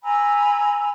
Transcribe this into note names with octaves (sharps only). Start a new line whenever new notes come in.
G#5 A#5 B5 E6